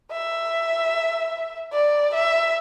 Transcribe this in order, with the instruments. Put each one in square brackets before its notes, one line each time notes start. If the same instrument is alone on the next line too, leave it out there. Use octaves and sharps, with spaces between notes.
[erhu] E5
D5
E5